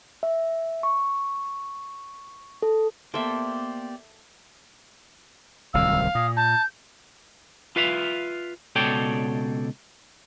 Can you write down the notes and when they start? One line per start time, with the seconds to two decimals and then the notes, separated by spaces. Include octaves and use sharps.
0.23 E5
0.83 C#6
2.62 A4
3.14 A#3 B3 G4 A4 C5 D5 E5
5.74 D1 C2 D#3 F5 E6
6.15 A#2 D#6
6.36 A5 G6
7.76 F4 B4 E5 F5
8.76 C#2 B2 A4 C#5 D5 G5